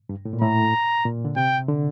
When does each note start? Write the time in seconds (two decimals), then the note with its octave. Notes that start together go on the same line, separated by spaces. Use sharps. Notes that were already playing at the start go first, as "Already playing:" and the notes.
0.09 G2
0.25 A2
0.33 A#2
0.41 A2 A#5
1.05 A#2
1.25 D3
1.36 C3 G5
1.68 D3